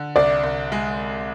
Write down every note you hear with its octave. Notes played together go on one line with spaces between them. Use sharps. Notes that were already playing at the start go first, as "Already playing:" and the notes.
Already playing: D3
C2 D5
C2
G#3